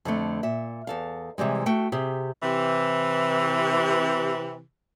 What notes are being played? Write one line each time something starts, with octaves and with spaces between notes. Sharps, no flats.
F2 D3 A3
A#2 E5
E2 A4 F5
C3 E3 G3 G#3
A3 F#4 G5
C3 G4 G#4
C3 E3